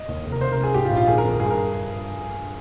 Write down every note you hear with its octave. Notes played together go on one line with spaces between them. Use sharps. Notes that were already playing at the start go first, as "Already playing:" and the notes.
Already playing: D#5
D#2
F1
A#4
C#3 C5
A#4
C#2
G#4
G#2 G4
F4
A#1
F4
D#3 G#4
A#4
F2
A#4
G2 G#4
A#4